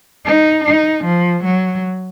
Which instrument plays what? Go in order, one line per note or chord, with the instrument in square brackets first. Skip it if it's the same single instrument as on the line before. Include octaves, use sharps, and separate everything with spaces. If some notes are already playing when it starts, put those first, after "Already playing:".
[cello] D#4
D#4
F3
F#3